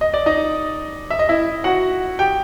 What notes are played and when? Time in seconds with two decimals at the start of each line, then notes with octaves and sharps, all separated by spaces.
0.01 D#5
0.14 D5
0.26 D#4 D#5
1.10 E5
1.19 D#5
1.29 E4 E5
1.64 F#4 F#5
2.19 G4 G5